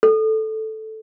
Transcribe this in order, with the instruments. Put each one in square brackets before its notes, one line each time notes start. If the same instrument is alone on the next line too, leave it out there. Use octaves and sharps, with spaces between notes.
[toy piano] A4